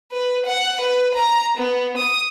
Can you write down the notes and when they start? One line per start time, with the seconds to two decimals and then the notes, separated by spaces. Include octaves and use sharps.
0.12 B4
0.46 F#5
0.81 B4
1.14 A#5
1.57 B3
1.97 D#6